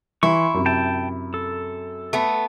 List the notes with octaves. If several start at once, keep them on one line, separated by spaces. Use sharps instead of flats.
E3 E4 C6 C#6
F#2 C3
G5 A5
A4
A3 B3